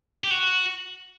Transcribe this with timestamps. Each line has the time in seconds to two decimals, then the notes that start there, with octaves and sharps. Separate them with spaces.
0.24 G4
0.31 F#4